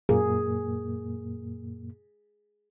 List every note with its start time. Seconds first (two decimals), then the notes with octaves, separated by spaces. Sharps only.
0.09 F#2 A#2 A#3 G#4